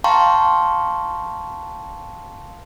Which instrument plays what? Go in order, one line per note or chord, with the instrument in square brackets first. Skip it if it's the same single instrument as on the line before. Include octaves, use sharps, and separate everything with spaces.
[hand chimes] F5 G5 A5 A#5 C6 C#6